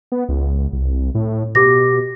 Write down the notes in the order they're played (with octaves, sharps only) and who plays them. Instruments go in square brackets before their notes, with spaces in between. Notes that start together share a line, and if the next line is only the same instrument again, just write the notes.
[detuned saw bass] B3
C#2
C2
A2
[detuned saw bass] B2 [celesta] G4 D6 A#6